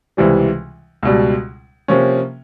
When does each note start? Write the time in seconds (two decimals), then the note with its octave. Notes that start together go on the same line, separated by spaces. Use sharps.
0.17 C#2 C3 E3 G3
1.03 C#2 B2 G3
1.88 C3 F3 A#3 C#4